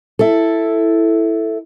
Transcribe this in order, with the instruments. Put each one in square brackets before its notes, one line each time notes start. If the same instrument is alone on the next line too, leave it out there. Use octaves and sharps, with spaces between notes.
[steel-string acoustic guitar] E4 A4